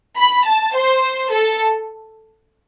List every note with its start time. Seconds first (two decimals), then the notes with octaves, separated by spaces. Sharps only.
0.18 B5
0.46 A5
0.75 C5
1.31 A4